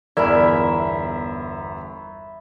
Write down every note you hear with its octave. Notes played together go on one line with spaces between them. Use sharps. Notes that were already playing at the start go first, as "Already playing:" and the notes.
G1 E2 A#4 D5 E5 B5